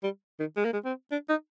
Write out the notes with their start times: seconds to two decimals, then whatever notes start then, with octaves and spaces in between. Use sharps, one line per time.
0.03 G3
0.40 D#3
0.57 G#3
0.65 A#3
0.73 G#3
0.85 C4
1.11 D4
1.29 D#4